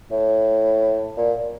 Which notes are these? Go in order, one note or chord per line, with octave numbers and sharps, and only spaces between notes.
A2
A#2